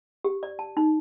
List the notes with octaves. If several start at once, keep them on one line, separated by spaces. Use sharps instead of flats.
G4
D5
A5
D#4